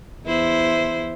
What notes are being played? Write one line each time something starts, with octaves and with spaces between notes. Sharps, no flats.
E2 E4 C5